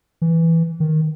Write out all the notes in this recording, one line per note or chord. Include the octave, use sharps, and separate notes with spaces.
E3
D#3